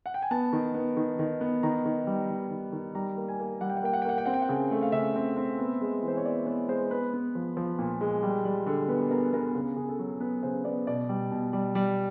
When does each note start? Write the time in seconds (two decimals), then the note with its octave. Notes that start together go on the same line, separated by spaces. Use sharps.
0.06 F#5
0.14 G5
0.22 G#5
0.31 B3 A5
0.53 D#3
0.74 B3
0.97 D#3
1.19 D#3
1.41 B3
1.63 D#3 A#5
1.85 D#3
2.07 G3
2.29 D#3
2.50 D#3
2.72 D#3
2.95 G3 A#5
3.17 A#3
3.29 G#5
3.40 A#3
3.61 G3 F#5
3.70 G5
3.77 F#5
3.83 A#3 G5
3.93 F#5
4.02 G5
4.05 A#3 F#5
4.18 G5
4.25 C4 F#5
4.34 G5
4.42 F#5
4.49 C#3
4.71 A3
4.82 F5
4.92 C#3 E5
5.16 C4
5.37 C4
5.59 B3
5.81 G#3
6.03 E3
6.08 C5
6.17 C#5
6.25 B3 D5
6.47 B3 C#5
6.68 G#3 C5
6.91 B3 B4
7.13 B3
7.35 F3
7.57 F3
7.79 A#2
8.01 G#3
8.23 G3
8.45 G3
8.66 D3
8.88 B3 B4
9.11 B3 A#4
9.33 B3 A#4
9.55 C#3
9.76 C#3 G#4
9.89 A4
9.99 F#3
10.20 B3 B4
10.43 C#3 C5
10.65 B3 D5
10.87 B2 D5
11.09 G3
11.31 B2
11.53 G3
11.75 G3